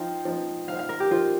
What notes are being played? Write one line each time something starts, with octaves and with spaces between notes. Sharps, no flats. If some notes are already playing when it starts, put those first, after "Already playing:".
Already playing: F3 D#4 C5 F5 G5
F3 D#4 C5
F3 D#4 C5 F5
F5
A#4
G4
F3 D#4 F4 C5